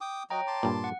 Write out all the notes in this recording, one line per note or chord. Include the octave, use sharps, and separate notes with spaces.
G5 D6 D#6
F#3 C#5 D#5 G5 A#5
A5 C6 D6
G2 A#2
F#5